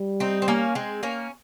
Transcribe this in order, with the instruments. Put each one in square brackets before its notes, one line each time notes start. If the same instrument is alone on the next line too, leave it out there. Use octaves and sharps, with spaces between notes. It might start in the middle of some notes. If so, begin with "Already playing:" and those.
Already playing: [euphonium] G3
[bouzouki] C4 D#4
C4
A#3 C#4
G#3 C4
A#3 C#4